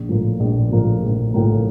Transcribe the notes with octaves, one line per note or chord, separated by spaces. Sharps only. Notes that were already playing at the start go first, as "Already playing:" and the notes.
Already playing: A#1
A2 F3 A#3
A#1
A2 F3 A#3
A#1
A2 F3 A#3